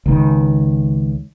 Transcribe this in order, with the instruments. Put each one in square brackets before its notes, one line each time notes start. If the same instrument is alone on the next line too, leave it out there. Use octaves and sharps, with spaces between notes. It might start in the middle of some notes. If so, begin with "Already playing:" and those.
[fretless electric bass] C#2 D#3